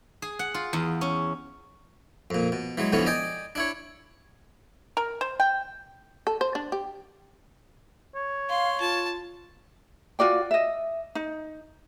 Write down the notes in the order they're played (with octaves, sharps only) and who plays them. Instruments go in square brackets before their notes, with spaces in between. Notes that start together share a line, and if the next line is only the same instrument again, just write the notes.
[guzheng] G#4
F#5
F4
E2
C#4
[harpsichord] F2 A#2
B2
E3 F#3 G#3
F2 B2 D3 E3 B3 C#4
D5 D#5 G5 G#5
D4 E4 C#5
[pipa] A#4
C5
G5
[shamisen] A4
C5
D4
G4
[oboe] C#5
[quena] F5 [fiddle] C6
[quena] F4 [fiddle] A5
[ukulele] F4 F#4 D5 G5
D#5 E5
D#4